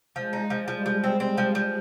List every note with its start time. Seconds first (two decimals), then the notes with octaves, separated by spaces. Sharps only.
0.16 F3 G#3
0.33 D#4
0.50 F3
0.68 F3 G3
0.86 F3
1.04 C4
1.20 C4
1.38 F3
1.55 F3